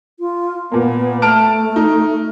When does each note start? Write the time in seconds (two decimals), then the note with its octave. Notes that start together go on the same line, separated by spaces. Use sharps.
0.20 F4
0.71 A#2 A#3 B3
1.22 A3 A5 F6 D7
1.76 D#4